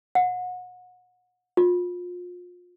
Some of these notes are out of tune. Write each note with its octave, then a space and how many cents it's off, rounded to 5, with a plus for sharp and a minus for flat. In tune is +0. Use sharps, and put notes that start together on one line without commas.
F#5 -30
F4 +30